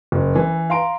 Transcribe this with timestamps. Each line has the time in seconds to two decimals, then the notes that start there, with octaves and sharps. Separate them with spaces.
0.12 F#1
0.35 E3
0.70 F5 A#5 C6 D7